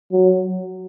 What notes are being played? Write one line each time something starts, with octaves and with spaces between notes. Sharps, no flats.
F#3